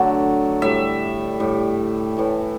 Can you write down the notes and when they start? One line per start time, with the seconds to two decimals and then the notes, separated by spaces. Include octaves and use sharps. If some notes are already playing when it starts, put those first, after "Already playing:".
Already playing: D3 F#3 A3
0.62 A2 G3 E5
1.40 A2 G3
2.17 A2 E3 A3